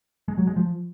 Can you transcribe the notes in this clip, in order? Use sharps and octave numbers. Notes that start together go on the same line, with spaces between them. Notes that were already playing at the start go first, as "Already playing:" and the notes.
G#3
F#3
G#3
F3